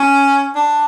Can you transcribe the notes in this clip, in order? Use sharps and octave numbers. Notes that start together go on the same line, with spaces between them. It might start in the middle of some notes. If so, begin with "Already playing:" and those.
Already playing: C#4
D4